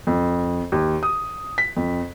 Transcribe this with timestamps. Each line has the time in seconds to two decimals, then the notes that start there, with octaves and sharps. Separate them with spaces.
0.07 F2
0.72 D#2
1.03 D#6
1.58 B6
1.77 F2